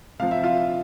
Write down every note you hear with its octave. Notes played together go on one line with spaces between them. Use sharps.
C3 F3 F5
E5
F4 F5